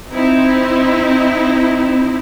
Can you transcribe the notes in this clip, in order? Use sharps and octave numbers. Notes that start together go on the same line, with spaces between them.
C4 D#4 E4